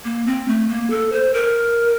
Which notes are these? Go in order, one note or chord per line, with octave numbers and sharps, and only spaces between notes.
A#3
C4
A3
A#3
A4
C5
A#4